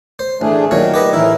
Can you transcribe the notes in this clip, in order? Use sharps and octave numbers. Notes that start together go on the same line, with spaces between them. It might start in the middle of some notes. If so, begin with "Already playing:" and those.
C5
A1 A3 D4 G#4
A#2 D#3 F#3 C#5
G4 B4 D#5
A2 E3 E4 A#4